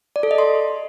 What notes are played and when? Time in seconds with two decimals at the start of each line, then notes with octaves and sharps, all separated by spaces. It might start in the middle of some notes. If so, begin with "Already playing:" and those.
0.16 D5
0.23 A4
0.31 D#5
0.38 C6